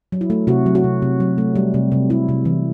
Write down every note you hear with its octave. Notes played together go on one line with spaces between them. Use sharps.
F#3
E4
A3
C3 F#4
F#3
F#4
C3
C3
F#3
A3
G3
C3
C3
G3 E4
C3
E3